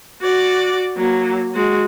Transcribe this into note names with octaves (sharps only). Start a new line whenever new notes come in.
F#4 D5
F#3 A#3
G#3 F#4